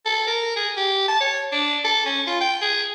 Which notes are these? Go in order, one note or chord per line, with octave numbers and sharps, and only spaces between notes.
A4
A#4
G#4
G4
A5
C#5
D4
A4
C#4
F4
G5
G#4